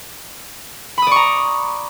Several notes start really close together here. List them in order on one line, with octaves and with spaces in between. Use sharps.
B5 D#6 D5 C#6 A#5